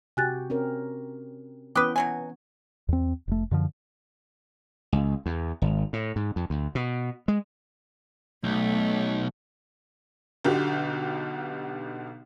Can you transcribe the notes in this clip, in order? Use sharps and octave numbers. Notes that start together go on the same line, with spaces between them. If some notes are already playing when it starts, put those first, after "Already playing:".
C3 F#4 G4 G#5 F#6 A6
C4 C#4 A#4
E3 B3 C#4 B4 G5 D6 D#6 F#6
B2 F#3 G#5
E2 C4
F1 A3
F#2 D3 D#3 F3
C#2
E2
G#1
A2
G#2
F2
D2
B2
G#3
B1 A3
B1 B2 D3 G4